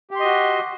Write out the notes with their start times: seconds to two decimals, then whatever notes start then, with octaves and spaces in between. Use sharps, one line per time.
0.11 G4
0.15 C6
0.20 D#5
0.25 F#4